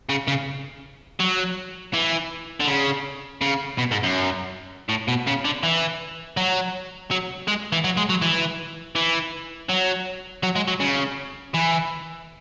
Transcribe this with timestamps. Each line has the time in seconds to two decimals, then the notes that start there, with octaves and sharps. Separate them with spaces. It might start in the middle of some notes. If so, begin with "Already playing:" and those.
0.09 C#3
0.28 C#3
1.20 F#3
1.94 E3
2.60 D3
2.68 C#3
3.42 C#3
3.78 B2
3.91 G#2
4.03 F#2
4.89 A2
5.08 B2
5.27 C#3
5.45 D3
5.63 E3
6.37 F#3
7.11 F#3
7.48 G#3
7.72 E3
7.84 F#3
7.97 G#3
8.09 F#3
8.22 E3
8.95 E3
9.69 F#3
10.43 F#3
10.56 G#3
10.68 F#3
10.80 C#3
11.54 E3